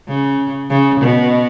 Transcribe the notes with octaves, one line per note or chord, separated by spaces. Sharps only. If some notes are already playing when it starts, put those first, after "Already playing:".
C#3
C#3
B2